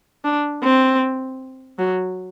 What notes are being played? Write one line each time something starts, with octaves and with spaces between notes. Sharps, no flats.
D4
C4
F#3